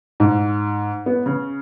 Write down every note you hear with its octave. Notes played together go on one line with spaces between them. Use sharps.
G#2
B3
C#3